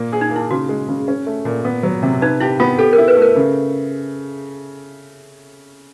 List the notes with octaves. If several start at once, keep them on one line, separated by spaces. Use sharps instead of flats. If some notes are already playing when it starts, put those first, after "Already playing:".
Already playing: A#2 A#3
G#4
D#4
A#3 E4
C#3 F#4
G#3
C#3
C#4
A3
A#2
B3
F#3
C3
D#4 B4
E4 G4
B3 F4
G4 A4
A#4
E4
B4
A3
A#4
C#3